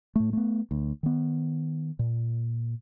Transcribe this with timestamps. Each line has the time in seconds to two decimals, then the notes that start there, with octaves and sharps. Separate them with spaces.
0.16 A2 A3
0.33 A3 B3
0.71 D2
1.03 D#3 B3
1.99 A#2